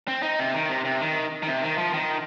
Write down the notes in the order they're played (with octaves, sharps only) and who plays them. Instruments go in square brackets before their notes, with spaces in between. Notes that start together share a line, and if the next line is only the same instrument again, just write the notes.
[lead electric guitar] C4
D#4
C3
D#3
C3
C3
D#3
D#3
C3
D#3
F3
D#3